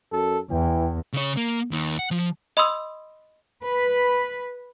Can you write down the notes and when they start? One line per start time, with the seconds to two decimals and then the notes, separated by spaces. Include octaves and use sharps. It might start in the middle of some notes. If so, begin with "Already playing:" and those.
0.12 F#2 A4
0.51 E2 E3 G5
1.13 C#3 C#5
1.37 A#3
1.71 D#2
1.99 F#5
2.11 F3
2.57 D#5 B5 C6 D#6 E6
3.65 B4